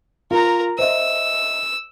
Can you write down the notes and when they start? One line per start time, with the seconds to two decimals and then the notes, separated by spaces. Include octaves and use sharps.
0.31 F4 A#4 A#5
0.79 C5 D#5 E5 E6